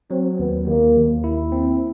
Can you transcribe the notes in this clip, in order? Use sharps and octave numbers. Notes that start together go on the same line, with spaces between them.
F#3 C4
D#2 B3
D#2 A#3
D#2
E4
C4